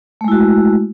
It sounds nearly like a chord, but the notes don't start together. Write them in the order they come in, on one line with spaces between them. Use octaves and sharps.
A3 G#3 E4 F#4